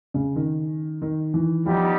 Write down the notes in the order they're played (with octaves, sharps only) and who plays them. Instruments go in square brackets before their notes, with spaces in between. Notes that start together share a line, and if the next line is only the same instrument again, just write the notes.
[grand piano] C#3
D#3
D#3
E3
[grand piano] F3 [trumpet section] G3 B3 D#4 G4